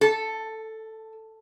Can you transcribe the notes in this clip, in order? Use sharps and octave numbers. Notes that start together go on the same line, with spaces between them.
A4